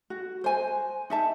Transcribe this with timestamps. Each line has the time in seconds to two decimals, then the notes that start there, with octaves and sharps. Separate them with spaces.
0.10 F#4
0.44 C5 G#5
1.10 D#4 E5 A5